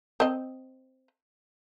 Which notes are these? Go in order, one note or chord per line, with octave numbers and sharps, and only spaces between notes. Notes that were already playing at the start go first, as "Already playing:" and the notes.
C4 D#5